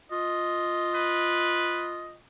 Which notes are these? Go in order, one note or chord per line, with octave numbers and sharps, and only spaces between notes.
F4 D#5
B4